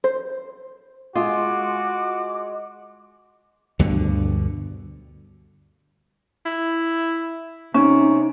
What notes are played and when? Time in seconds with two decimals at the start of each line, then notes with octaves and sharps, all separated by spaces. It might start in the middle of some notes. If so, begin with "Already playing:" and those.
0.04 C5
1.15 G#3 F4 F#4 D6
3.79 D2 G2 B2 D3
6.46 E4
7.74 C3 C#4 D#4